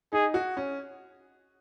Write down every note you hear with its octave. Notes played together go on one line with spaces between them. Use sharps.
D#4 G#4
F#4
C#4